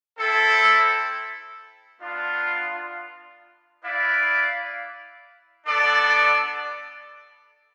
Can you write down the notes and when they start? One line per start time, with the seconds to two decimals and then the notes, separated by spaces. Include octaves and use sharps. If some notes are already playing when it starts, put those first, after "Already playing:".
0.19 C4 E4 A4
2.01 B3 D4 F4
3.83 E4 B4 D5 F5
5.66 B3 D4 A4 D5